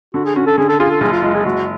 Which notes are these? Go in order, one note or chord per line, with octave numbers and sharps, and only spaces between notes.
D3 F#4
G#4
C#4 F#4
A4
D3 G#4
A4
F4 G#4
A4
F#1 G#4
F4
G#3 F4
G#4
F#1 F#4